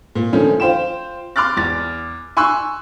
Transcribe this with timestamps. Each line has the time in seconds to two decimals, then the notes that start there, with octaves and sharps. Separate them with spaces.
0.15 A#2
0.33 D3 D#3 F3 A3 C#4
0.60 F4 C5 G5 E7
1.36 C6 D6 F6 F#6 A6
1.57 E2 A6
2.37 G#5 C6 C#6 E6 F#6